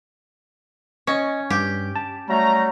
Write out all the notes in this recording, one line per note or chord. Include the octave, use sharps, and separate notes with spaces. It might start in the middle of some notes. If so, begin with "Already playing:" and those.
C#4 D#5 C#6
G2 G4
A5
F#3 G3 A3 A#5